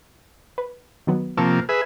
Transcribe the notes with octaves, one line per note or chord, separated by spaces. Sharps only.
B4
D#3 F#3 B3
C3 F3 A#3 A5 C#6 E6
G#4 B4 E5